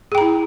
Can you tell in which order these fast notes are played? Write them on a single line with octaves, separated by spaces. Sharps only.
G#4 G5 A#5 E4